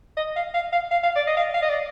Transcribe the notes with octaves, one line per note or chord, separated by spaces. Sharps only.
D#5
F5
F5
F5
F5
F5
D5
D#5
F5
F5
D#5
D5